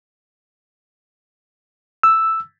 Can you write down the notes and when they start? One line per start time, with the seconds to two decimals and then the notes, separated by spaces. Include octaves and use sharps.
2.03 E6